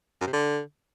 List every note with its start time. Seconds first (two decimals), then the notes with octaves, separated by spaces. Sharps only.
0.21 F#2
0.27 C3
0.33 D3